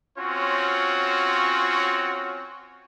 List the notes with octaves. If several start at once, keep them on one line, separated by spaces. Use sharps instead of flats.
C4 C#4 F4 F#4 C#5